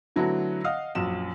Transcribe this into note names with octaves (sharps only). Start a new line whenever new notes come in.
D3 F#3 A3 B3 E4 F#4
D#5 F5 F#5 D#6 F6
A#1 F#2 E7